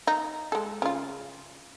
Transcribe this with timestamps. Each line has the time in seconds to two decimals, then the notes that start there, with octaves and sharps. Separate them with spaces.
0.07 D#4
0.52 G#3 A4
0.82 C#3 F4